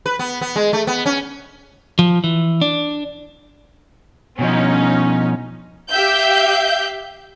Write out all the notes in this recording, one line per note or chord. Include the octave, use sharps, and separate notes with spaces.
B4
B3
B3
G#3
A3
B3
C#4
F3
E3
D4
B2 F3 C#4 D#4
G4 E5 F5 G6